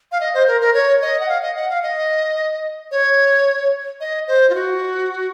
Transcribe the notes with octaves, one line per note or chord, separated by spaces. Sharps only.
F5
D#5
C5
A#4
A#4
C#5
D#5
F#5
F5
D#5
F#5
F5
D#5
C#5
D#5
C5
F4
F#4